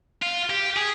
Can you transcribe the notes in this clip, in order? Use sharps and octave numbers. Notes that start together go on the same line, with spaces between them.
F4
G4
G#4